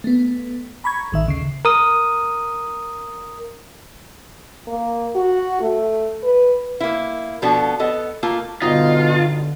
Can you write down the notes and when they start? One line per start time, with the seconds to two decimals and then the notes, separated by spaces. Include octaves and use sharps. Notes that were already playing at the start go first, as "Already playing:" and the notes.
0.04 A3 B3
0.84 A#5 B5 C#6 G#6
1.12 A1 D#3 E5
1.26 D#2 C#3 C7
1.65 A#4 D#6
4.67 A#3
5.15 F#4
5.62 A3
6.24 B4
6.80 A#3 E4
7.42 B2 F3 B3 D4 F#4 A4
7.80 B3 A4 D#5
8.23 A3 A#3 F4
8.62 G1 B2 D3 D#4 F4 D#5